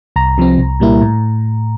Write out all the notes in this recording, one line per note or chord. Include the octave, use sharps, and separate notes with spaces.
C2 A#5
C3 F3 C4
C2
A#2 G3 A#3 E4
A2